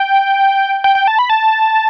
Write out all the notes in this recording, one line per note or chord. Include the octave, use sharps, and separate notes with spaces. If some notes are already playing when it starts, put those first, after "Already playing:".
Already playing: G5
G5
G5
A5
B5
A5